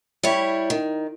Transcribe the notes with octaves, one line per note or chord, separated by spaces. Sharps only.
G3 E4 C#5
D#3